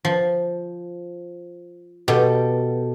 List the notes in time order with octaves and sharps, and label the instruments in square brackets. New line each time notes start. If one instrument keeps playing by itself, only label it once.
[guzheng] F3
[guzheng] B2 [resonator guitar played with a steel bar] G4 A4